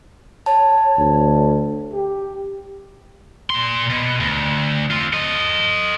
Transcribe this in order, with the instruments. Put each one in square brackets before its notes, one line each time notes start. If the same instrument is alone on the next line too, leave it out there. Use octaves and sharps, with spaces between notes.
[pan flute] C#5 [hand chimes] A5
[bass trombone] D2
[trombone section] G4
[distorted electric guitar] A#2 C6
B2
D2
C4 F4
A4 D#5